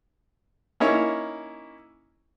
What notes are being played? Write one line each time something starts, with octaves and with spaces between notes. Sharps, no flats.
A#3 C#4 D#4 E4 C#5